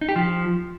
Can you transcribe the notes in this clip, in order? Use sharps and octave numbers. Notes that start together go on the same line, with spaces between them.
D#4
G4
F3